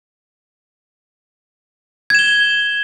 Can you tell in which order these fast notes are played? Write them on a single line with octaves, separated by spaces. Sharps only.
G#6 E7 G7